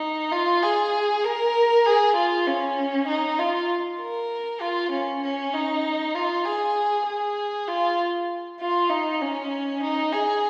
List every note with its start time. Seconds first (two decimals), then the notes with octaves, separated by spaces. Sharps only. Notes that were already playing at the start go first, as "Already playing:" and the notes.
Already playing: D#4
0.32 F4
0.63 G#4
1.24 A#4
1.86 G#4
2.16 F4
2.47 C#4
3.08 D#4
3.39 F4
4.00 A#4
4.61 F4
4.91 C#4
5.23 C#4
5.54 D#4
6.15 F4
6.45 G#4
7.06 G#4
7.68 F4
8.60 F4
8.90 D#4
9.22 C#4
9.83 D#4
10.12 G#4